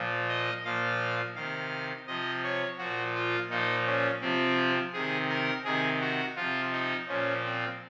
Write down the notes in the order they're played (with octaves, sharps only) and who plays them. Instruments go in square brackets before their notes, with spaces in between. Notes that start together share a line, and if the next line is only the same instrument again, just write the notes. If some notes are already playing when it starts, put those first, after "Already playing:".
Already playing: [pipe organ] A#2 F3
D#5
A#2 F3 F5
C3 D#3 F5
C3 F3 D#5
C#5
A#2 F3 F#4
F4
A#2 F3 D#4
C#4
C3 F3 C4
C3 D#3 G#4
A#4
C3 D#3 G#4
F#4
C3 F3 F4
D#4
A#2 F3 C#4
C4